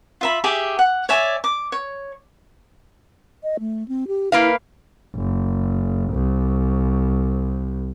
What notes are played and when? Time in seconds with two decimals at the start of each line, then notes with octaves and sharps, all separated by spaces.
0.21 F4 E5 B5
0.44 G4 G#4 E5 D6
0.79 F#5
1.09 C#5 D5 E5 G#5
1.44 D6
1.72 C#5
3.43 D#5
3.60 A3
3.88 C4
4.08 G4
4.32 A#3 E4 B4 F5
5.15 F#1
6.13 C2